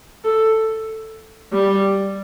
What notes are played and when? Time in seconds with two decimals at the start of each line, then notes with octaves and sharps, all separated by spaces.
0.24 A4
1.53 G3